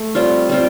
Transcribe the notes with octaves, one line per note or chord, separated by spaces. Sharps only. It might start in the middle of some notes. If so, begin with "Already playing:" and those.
Already playing: A3
G3 C4 F4
G3 C4 F4